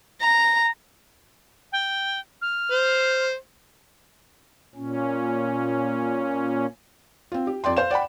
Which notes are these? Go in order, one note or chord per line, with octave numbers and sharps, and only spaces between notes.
A#5
G5
F6
C5
A#2 C#4
C4 F4
G4
F2 D5 G5 C6
C5 F5 E7
D5 F#5 G5 B5